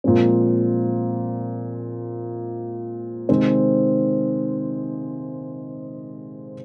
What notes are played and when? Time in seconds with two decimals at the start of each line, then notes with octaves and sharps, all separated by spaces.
0.04 A#2 F3 G#3 C4
3.29 C3 D#3 G#3 C4